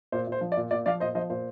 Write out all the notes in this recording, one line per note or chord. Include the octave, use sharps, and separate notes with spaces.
A#2 C5
A#2 C5
F3
D5
A#2
A#2 D5
F3 D5 F5
A#2 C5 D#5
F3 C5 D#5
A#2 C5